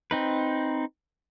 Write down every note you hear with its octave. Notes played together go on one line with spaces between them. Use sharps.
C4 D#4 B4